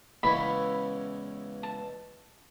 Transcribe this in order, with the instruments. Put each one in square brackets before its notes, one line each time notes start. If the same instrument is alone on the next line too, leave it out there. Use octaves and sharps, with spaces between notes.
[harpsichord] E2 C#3 E3 G#3 C#4 [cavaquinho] B5
[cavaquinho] A5